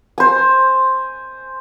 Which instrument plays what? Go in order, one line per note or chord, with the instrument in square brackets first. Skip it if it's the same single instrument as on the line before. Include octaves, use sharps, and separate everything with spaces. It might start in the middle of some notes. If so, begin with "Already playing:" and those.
[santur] C5 G#5